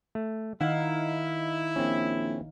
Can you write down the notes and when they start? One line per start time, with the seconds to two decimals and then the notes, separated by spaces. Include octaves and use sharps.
0.15 A3
0.61 D#3 D#4 E4 F5 F#5
1.76 A#1 C4 C#4